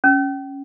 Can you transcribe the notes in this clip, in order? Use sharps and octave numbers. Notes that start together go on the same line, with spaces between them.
C#4